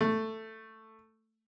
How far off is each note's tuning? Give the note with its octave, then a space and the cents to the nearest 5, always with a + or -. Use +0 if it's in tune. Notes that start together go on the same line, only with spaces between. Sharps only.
A3 +10